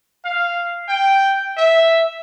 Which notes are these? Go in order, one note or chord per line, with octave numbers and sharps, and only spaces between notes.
F5
G5
E5